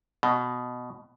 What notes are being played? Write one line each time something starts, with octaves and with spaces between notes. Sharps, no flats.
B2